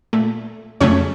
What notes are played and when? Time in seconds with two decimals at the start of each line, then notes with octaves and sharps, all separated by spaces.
0.13 A#2 A3
0.81 F2 C#3 F#3 A3 C#4 C#5